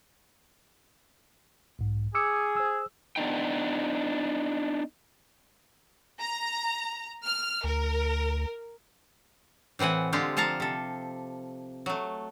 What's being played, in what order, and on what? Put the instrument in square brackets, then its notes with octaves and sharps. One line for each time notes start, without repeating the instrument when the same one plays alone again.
[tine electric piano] B1 G#2
[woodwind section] G#4 [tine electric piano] D6 E6 C#7
[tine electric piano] C5 E6
[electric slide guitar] B3 D4 D#4 G5
[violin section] A#5
F6
[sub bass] D2 [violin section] A#4
[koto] A2 E3 C4 F#5 G#5
D3 G#3 C4 F4 G4
F3 A4 F5 A5 A#5
C3 A4
F#3 A3